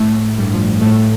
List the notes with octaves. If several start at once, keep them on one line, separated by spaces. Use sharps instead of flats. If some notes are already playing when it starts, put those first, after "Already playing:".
Already playing: A2 A3
G2 G3
F3
F3
A2 A3